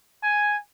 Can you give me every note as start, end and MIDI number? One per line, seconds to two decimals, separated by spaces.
0.22 0.56 80